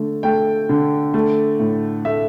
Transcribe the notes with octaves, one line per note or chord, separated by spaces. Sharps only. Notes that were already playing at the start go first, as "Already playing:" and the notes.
Already playing: D3 A3
A3 G5
D3
A3
A2
A3 E5